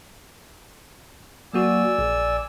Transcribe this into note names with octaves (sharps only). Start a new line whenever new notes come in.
F#3 A#3 F#4 D5 G#5 E6
A#1